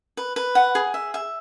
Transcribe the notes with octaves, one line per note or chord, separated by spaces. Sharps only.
B4
B4
F#5
G#4
E5
E5